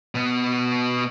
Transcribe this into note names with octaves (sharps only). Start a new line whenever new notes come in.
B2 B3